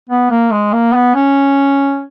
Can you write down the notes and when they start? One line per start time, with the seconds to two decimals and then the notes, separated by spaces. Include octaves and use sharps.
0.10 B3
0.31 A#3
0.52 G#3
0.73 A#3
0.94 B3
1.15 C#4